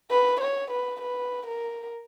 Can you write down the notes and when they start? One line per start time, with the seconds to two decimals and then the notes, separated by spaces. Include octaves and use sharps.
0.11 B4
0.41 C#5
0.71 B4
1.01 B4
1.46 A#4